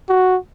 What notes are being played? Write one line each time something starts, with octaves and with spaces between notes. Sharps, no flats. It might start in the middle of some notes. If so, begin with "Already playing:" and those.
F#4